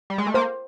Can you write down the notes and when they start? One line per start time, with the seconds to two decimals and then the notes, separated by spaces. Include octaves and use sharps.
0.10 G3
0.18 G#3
0.27 A3
0.34 A#3 C5